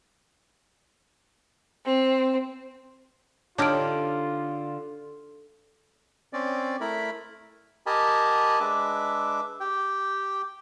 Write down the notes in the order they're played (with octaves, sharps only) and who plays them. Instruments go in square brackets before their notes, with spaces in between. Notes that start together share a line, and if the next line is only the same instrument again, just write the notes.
[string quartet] C4
[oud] D3 [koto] D4 D#4 G4 [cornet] F4 [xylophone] C#5 F6 D7
[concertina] C4 C#4 D5
A3 E4 A#4 B5
G4 A#4 D#5 G#5 A5 B5
G#3 D4 B4 E5 D6
G4 G5